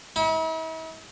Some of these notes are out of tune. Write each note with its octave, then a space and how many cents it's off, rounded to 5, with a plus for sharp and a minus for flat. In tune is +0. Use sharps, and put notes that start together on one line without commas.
E4 -45